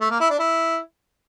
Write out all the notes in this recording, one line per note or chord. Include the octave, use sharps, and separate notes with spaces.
A3
A#3
E4
D4
E4